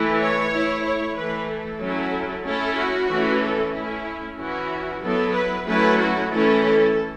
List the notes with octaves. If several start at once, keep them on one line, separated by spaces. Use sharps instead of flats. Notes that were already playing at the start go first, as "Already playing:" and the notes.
Already playing: E3 A3 E4
C#5
A3 E4
C#5
E3 A3 E4 B4
A4
F#3 C#4 E4
A3 C#4 E4 A4
F#4
E3 A3 C#4
A4
A3 C#4 E4
E3 C#4 E4 F#4
F#3 B3 E4 A4
B4
F#3 A3 C#4 E4 B4
F#4
E3 A3 C#4 E4 A4
A4